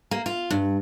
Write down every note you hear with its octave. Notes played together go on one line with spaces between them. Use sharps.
A#3
F4
G2